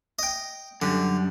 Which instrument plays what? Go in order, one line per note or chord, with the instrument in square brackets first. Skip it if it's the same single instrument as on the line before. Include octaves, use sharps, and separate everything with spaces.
[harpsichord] D#5 G5
[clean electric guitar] F#2 G3 [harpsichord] D3